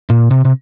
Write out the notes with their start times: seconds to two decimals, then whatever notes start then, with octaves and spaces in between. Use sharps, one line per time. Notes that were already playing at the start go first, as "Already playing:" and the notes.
0.10 A#2
0.31 C3
0.45 C3